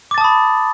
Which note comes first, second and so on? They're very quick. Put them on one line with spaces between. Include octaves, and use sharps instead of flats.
D6 A6 A5 D#6 B5